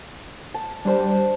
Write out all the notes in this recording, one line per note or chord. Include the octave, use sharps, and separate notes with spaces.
A5
G3 D4 C5 A5